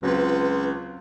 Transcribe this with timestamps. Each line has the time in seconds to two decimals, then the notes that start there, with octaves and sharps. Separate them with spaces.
0.03 C#2 F#3 C4 F4 B4